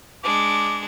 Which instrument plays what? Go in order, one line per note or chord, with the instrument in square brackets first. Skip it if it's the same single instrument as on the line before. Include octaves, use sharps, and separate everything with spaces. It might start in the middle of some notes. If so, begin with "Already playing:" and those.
[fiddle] G#3 D4 [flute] D6